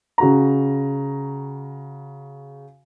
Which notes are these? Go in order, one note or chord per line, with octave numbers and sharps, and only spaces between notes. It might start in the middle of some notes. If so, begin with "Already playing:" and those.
C#3 F#4 A#5